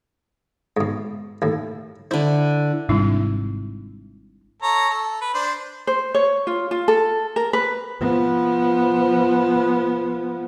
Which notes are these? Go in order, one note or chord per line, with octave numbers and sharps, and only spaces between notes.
G#2 B2
D#2 A2
D3 E4 C5
G#1 G#2 C3 G3 D4 E4
A4 C#5 A#5
A4
B4
D4 C5
C5
C#5
F4
F4
A4
A#4
B4
F3 B3